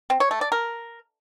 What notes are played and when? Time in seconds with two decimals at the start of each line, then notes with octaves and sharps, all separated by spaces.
0.10 C4
0.20 C#5
0.31 A3
0.41 D5
0.52 A#4